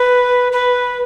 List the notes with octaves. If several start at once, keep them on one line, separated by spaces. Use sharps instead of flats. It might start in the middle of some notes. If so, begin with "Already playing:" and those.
Already playing: B4
B4